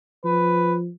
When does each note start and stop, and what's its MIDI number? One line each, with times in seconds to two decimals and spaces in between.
0.25 0.91 53
0.25 0.74 71